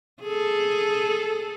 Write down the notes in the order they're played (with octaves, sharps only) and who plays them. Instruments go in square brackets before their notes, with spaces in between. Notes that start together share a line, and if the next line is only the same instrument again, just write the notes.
[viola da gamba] G#4 A4